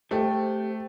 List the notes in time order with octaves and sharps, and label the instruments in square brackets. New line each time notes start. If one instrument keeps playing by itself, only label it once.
[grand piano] A3 [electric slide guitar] G4 C5 G5